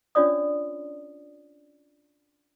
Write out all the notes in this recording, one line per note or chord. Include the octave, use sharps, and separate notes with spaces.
C#4 D4 F4 C#5 D5 D#6